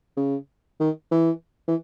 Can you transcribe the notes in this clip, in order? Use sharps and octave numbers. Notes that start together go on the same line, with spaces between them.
C#3
D#3
E3
E3